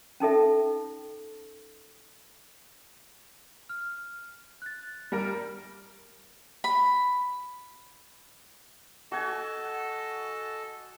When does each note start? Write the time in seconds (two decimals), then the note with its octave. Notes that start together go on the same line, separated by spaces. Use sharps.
0.20 C#4 D#4 A4 E5
3.69 F6
4.62 F#6 A6
5.12 G3 A#4
6.64 B5
9.12 F#4 A4 D#5 G#5 A5